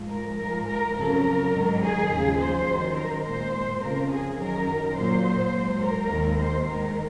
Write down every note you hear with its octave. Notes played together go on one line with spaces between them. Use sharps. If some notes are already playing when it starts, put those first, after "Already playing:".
Already playing: G#2 F3 G#3
A#4
G#2 F3 G#3 A#4
A#4
F2 C#3 F#3 A#4
G#2 D#3 F#3
G#4
D#2 C#3 F3
C5
F#2 D#3 F#3
A#4
A#2 G#3 C5
F2 C#3 F3 A#4
G#4
F#2 D#3 F#3 A#4
A#2 F#3 C5
G#2 F#3
A#4
D#2 D#3 G#3
C5
G#2 D#3 G#3 A#4